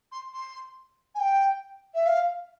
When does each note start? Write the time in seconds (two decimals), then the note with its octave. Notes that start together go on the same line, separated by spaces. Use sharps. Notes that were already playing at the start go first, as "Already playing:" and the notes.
0.11 C6
0.33 C6
1.15 G#5
1.19 G5
1.94 E5
2.06 F5